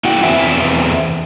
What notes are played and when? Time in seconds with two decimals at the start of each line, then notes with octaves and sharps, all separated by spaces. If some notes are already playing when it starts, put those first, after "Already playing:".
0.05 A#3 E4 F#4 F#5 G5
0.23 E2 C4 E5 G#5